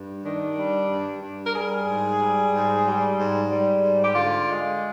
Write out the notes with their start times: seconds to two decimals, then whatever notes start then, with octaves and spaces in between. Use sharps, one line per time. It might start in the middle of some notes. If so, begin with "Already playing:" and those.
Already playing: G2
0.25 D#3 D4
0.58 G3
0.91 G2
1.23 G2
1.47 A#4
1.55 G3 G#4
1.88 G#2
2.20 G3
2.52 G#2
2.85 G3
3.17 G#2
3.50 G3
3.82 G#2
4.03 G4
4.15 D3 F4
4.48 G#3